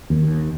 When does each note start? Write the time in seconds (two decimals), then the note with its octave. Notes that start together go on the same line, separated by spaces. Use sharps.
0.10 D#2